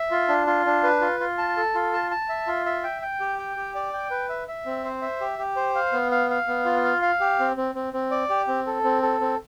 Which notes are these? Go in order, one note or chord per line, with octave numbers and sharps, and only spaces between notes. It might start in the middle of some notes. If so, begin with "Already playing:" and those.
Already playing: E5
F4
D4
F4
D4
B4
F4
F4
A5
A4
F4
A5
A5
E5
F4
E5
G5
G5
G4
G5
G4
D5
G5
B4
E5
E5
C4
C5
E5
G4
G4
C5
F5
B3
F5
F5
B3
F4
F5
F5
G4
C4
C4
C4
C4
D5
G4
C4
A4
C4
A4
C4